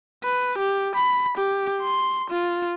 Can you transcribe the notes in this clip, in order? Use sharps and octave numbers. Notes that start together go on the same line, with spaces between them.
B4
G4
B5
G4
C6
F4